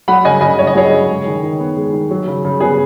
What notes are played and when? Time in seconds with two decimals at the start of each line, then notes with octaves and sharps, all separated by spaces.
0.08 F#3 F#5 B5
0.25 C#3 D#5 G#5
0.41 C#3 D#5 G#5
0.58 C#4 C#5
0.67 D#5
0.75 F#3 G#4 C#5
0.92 C#3
1.09 G#3
1.26 D#3
1.43 D#3
1.60 B3
1.77 G#3
1.93 D#3
2.11 F#3
2.28 C#3
2.45 C#3
2.60 B3 G#4